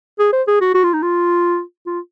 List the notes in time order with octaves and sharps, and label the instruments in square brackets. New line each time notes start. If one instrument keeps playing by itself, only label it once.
[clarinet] G#4
C5
G#4
F#4
F#4
F4
D#4
F4
F4